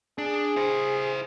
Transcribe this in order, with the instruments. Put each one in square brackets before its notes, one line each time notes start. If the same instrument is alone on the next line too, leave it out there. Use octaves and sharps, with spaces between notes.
[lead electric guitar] D4 [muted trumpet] G#4
[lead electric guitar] E4 C5